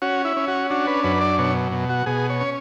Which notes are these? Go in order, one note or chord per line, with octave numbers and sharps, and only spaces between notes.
C#4 F#4
E4
C#4
F#4
D4 F#4
B4
F#2 B4
D5
B2 C#5
B2
F#4
B2 G#4
C#5
C#4